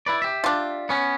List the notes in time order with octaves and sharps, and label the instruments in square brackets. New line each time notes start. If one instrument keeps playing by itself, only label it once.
[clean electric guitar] E4 B4 D5
G4 E5
[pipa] D4 F4
[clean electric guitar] B3 C#4